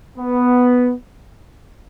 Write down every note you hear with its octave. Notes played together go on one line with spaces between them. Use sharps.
B3